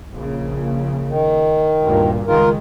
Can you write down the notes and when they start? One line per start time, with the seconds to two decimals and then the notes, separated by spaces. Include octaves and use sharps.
0.11 A#1 C#3
1.08 D#3
1.82 D2 G2 A#2
2.27 C#2 D#3 G#3 F4 A#4